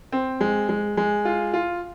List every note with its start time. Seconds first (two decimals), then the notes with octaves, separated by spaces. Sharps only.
0.12 C4
0.41 G#3
0.69 G#3
0.97 G#3
1.25 F4
1.54 F4